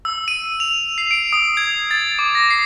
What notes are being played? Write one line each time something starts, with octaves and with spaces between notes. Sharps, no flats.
E6
D#7
F7
C7
D7
D#6
G#6
A6
D6
A#6
C7